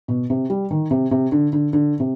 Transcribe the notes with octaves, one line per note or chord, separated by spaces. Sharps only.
B2
C3
G3
D#3
C3
C3
D3
D3
D3
C3